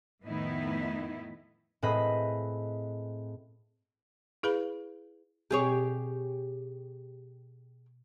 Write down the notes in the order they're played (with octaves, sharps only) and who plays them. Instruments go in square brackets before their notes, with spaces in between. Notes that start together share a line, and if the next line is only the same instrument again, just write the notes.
[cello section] F2 A2 D#3 B3 D#4 E4
[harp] A2 G#3 C4 B4 D#5 B5
[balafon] E4 G#4 B4 F5 B5
[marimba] B2 C4 [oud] G4 G#4 C#5